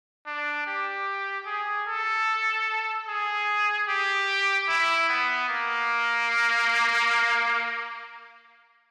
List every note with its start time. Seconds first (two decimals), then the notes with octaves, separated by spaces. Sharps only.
0.27 D4
0.67 G4
1.46 G#4
1.88 A4
3.08 G#4
3.88 G4
4.69 E4
5.09 B3
5.49 A#3